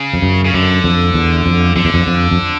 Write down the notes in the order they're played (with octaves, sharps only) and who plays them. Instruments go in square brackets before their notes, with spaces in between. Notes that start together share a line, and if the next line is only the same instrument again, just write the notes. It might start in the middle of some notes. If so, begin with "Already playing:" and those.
Already playing: [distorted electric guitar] C#3
[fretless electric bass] F2
F#2
[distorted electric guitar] C#3
[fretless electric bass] F#2 [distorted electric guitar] D3
[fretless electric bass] F2
E2
F2
[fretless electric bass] F2 [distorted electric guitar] D3
[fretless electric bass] E2
F2
F2
F2